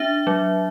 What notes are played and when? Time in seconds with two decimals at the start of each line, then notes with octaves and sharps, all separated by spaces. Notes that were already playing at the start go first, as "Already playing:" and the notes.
Already playing: D4 E5
0.27 F#3